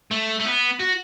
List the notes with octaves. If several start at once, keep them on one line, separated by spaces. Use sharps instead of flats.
A3
A3
B3
F#4